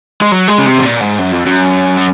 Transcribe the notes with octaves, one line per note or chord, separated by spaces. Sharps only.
G#3
F#3
G#3
C#3
C3
G#2
A#2
G#2
F#2
F2
F#2
F#3